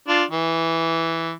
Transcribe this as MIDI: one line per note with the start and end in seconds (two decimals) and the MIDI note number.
0.08 0.24 62
0.08 0.24 65
0.31 1.32 52